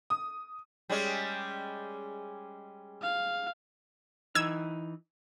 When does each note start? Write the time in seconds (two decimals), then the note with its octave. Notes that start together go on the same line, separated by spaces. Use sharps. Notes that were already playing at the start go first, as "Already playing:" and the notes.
0.10 D#6
0.90 G3 G#3 C#4
3.02 F5
4.35 E3 D#4 E6 G#6